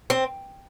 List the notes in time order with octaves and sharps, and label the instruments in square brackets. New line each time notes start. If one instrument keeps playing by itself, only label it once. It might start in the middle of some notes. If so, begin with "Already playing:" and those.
[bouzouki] C4